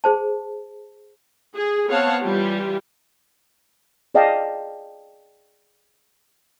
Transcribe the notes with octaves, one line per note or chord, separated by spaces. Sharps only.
G#4 C5 A5
G#4
B3 C4 C#5 F5 F#5 A5
E3 G3 F4 G4
G#4 D5 D#5 F5 G5 A5